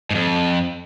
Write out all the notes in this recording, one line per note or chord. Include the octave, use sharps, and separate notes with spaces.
F2 G#2